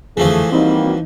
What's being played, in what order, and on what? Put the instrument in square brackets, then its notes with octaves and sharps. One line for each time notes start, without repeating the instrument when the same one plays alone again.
[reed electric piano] F2 D3 [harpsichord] E3 F3 [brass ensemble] A3 G#4
[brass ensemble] G3 A#3 F#4 [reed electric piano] C4 [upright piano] D#4